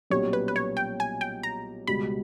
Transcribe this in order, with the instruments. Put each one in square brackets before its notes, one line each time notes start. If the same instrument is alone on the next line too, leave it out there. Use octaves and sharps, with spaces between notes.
[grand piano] B1 A#2 G3 C#4 G4 [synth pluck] C#5
[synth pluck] B4
B4
C#5
G5
G#5
G5
A#5
[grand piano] C#2 B2 G3 [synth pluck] B5